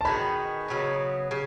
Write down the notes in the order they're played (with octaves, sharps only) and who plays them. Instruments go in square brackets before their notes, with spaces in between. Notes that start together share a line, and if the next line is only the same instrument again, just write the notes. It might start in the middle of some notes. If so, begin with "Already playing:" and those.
[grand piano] A5
[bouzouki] D#3 G#3 B3 F#4 [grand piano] B5
[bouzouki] C#3 F#3 B3
C#3